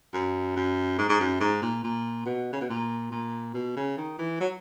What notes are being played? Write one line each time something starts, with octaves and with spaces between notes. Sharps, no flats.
F#2
F#2
G#2
G#2
F#2
G#2
A#2
A#2
B2
C#3
B2
A#2
A#2
B2
C#3
D#3
E3
F#3